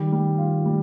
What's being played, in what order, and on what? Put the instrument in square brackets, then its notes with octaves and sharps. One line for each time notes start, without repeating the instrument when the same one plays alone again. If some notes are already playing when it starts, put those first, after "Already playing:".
Already playing: [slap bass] D#3 [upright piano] G3
[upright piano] G3
F4
G3